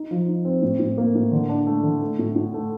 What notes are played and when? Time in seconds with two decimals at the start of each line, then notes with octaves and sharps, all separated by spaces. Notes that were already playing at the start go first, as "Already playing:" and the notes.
Already playing: D#4
0.11 F3
0.28 D#4
0.45 C4
0.62 A2
0.80 A2
0.98 A#3
1.15 A2
1.32 D3
1.49 D4
1.67 A3
1.84 D3
2.02 A3
2.19 A2
2.36 A2
2.54 A3